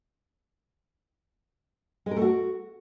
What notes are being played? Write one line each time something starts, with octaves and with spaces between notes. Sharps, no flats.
G#3
A#4
A3
F#4